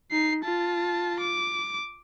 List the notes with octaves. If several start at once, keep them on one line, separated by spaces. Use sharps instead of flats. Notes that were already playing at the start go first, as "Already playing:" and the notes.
D#4 C7
F4 A5
D6